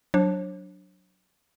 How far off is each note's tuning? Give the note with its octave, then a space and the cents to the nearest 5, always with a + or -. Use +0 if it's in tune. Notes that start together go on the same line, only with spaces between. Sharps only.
F#3 +0 D4 +0 C#5 -45